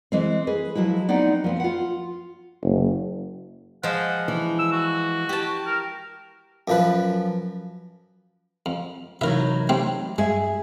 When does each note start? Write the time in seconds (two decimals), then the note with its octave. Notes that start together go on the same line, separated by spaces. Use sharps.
0.12 E3 G#3 C4
0.47 G#4 B4
0.75 F3 F#3 G#3 E4
1.09 B3 C4 D#4 D5 F#5 G5
1.44 F3 B3 C4
1.60 F4 F#5
2.64 F#1
3.83 F3 G#3 F#5
4.28 E3
4.59 E6
4.72 F#4
5.29 G4 A5
5.66 A#4
6.68 F#2 F3 B4
8.66 F2
9.21 C3 E3 F#3 D#4 A#4 B4 E5
9.69 A3 C4 G4
10.18 G2 G#3 G#4 E5